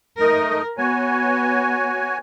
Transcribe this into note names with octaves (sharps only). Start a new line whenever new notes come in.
A3 D#4 A#4 D#5
B3 F#4 C#5 G#5